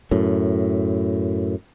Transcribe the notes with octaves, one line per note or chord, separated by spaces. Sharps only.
F#2 A2